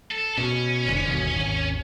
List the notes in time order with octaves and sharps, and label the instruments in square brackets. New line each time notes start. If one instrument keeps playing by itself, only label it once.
[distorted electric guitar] A4
[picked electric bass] B2 [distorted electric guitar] C#4
[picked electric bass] F1 B2 D3
G1 D#2 B2
G#1 D#2